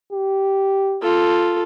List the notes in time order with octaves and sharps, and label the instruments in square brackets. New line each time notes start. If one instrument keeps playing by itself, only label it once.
[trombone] G4
[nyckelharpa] F4 A4